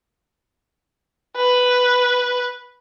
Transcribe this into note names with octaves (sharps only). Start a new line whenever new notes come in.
B4